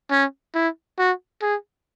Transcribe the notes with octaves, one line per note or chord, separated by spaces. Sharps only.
C#4
E4
F#4
G#4